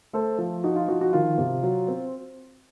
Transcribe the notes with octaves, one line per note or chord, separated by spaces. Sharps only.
A3 A4 C5
F3
D#4 F#4
F4
F3 F#4
F#4
D#3 F4
C3
F#3
C4